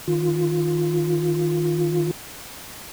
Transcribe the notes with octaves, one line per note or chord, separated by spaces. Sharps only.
D#3 F4